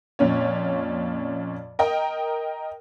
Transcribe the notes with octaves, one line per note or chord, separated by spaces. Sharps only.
F2 A#2 C#4 C#5
A#4 D#5 G5